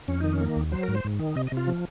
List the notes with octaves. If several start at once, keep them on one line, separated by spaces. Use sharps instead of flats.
F2 C#4
D#3 D#4
C#4
A#3
D#2
F#3 C5
A#4
G#2
C5
G#2
D#3
C3 D#5
D#5
C3 F4
F3